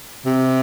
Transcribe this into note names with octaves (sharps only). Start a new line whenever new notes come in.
C3